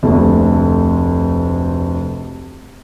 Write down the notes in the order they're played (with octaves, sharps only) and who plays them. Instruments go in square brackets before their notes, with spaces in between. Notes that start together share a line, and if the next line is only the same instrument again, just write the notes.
[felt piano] F1 D2 A3